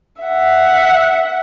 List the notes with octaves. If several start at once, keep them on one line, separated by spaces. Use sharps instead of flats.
E5 F#5